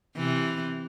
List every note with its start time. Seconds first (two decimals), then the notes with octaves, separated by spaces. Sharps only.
0.16 C3 E3